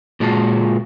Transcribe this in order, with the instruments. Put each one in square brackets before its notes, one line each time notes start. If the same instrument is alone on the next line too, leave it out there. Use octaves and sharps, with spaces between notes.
[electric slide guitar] A#2 G#3 F4 F#4 A5